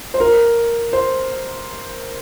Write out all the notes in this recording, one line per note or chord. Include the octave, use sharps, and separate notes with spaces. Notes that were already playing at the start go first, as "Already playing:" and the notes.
C5
A#4
C5